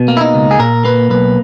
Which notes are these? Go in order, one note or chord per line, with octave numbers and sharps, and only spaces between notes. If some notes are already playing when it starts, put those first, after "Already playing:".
Already playing: B2
A#3
E4
D#4
C#2
G#4
A#2 A#4
A#3 B4
B1 B4